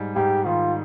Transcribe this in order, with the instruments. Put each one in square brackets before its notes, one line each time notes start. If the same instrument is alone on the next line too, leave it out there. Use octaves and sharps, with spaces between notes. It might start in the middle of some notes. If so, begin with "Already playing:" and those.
Already playing: [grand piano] G#2 G3
[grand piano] G#2 [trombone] G4
[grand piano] D#3 [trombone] F4